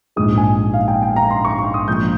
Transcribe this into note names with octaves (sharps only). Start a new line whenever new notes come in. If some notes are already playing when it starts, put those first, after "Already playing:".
A#1 G#2 F3 G#3 D#6
G#5
F5
G5
G5
A#5
C6
C#6
C#6
D#6
A#1 A#2 F3 G#3 G6